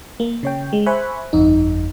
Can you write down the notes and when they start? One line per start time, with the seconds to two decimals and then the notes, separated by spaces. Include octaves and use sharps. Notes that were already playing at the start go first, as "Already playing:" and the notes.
0.20 A#3
0.43 C#3 C#5 G5
0.73 G#3
0.86 C5 E5 G#5 B5 C#6 F#6
1.33 G1 F2 D#4